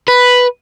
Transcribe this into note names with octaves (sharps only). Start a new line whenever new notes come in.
B4